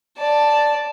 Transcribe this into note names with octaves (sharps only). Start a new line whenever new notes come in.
D5 A5